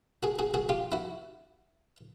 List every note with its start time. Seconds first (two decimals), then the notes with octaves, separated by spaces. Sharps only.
0.23 F#4 G#4
0.39 F#4 G#4
0.54 F#4 G#4
0.69 F4 G4
0.92 E4 F#4